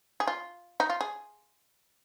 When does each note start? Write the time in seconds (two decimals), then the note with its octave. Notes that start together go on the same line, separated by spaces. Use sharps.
0.20 G#4
0.27 F4
0.80 D#4
0.90 F4
1.01 G#4